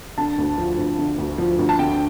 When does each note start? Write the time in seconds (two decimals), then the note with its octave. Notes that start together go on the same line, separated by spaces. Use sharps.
0.18 D3 A5
0.38 D2
0.58 F3
0.78 D2
0.98 D3
1.18 D2
1.38 F3
1.59 D2
1.69 A5
1.79 D3 G5